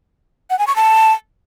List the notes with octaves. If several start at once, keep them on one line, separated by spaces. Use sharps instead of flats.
F#5
G#5
C#6
A5